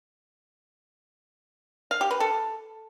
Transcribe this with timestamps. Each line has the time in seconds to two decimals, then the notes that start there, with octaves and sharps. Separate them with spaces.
1.91 F5
2.01 G4
2.11 B4
2.20 A4